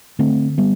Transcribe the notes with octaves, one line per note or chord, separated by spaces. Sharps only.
D3 A3 C4
G3 B3